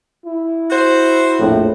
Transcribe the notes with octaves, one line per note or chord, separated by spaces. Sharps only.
E4
F#4 C5
A#1 F2 A2